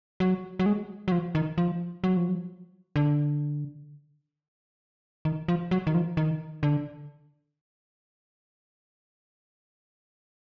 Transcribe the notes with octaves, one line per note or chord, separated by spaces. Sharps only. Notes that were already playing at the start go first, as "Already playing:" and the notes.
F#3
F#3
G#3
F#3
F3
D#3
F3
F#3
F3
F#3
D3
D#3
F3
F#3
D#3
F3
D#3
D3